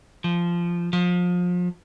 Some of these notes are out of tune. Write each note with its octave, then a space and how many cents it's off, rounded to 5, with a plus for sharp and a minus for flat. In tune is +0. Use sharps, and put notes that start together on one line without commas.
F3 -15
F3 +30